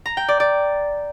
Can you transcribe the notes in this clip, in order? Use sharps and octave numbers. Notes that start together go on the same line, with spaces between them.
A#5
G5
D5
D5